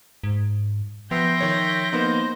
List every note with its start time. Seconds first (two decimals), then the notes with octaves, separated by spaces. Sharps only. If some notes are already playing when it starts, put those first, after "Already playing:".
0.23 G#2
1.11 F3 B3 E5 G5 C6 G6 A#6
1.40 D#3 C#5
1.93 A#3 B3 D#4 C5